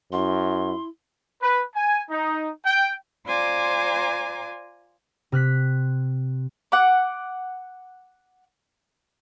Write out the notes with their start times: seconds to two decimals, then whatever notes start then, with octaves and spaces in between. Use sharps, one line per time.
0.12 F#2 E4 C6
1.42 B4
1.75 G#5
2.10 D#4
2.65 G5
3.26 F4 C5 D5 G#5 A#5 D6
5.32 C3 F6 F#6 B6
6.72 F#5 D6